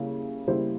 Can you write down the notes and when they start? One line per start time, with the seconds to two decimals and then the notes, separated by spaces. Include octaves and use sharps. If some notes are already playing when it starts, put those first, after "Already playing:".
Already playing: C#3 G3 A#3 E4
0.47 C#3 G3 A#3 E4 C5